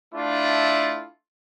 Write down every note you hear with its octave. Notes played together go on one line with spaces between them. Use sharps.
A3 D4 E4 F4